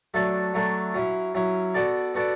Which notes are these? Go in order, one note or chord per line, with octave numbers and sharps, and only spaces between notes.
F#3 A3 D4 A4
F#3 A3 D4 A4
F#3 C#4 E4
F#3 C#4 E4
B3 F#4 A4 D5
B3 F#4 A4 D5